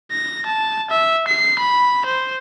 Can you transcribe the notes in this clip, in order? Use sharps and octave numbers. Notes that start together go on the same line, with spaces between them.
A#6
A5
E5
C7
B5
C5